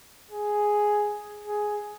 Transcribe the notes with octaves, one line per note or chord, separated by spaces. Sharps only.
G#4
G#4